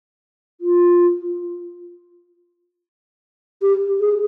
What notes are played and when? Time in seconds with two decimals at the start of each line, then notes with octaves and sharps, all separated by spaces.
0.61 F4
3.62 G4
4.00 G#4